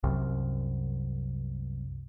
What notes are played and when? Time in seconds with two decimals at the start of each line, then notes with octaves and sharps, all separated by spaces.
0.04 C2 F#2